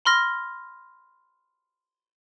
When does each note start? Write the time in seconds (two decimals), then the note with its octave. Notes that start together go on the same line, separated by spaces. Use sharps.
0.05 B5 C6 F6 A#6